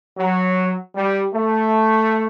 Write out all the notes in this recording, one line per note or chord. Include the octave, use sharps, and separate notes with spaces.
F#3
G3
A3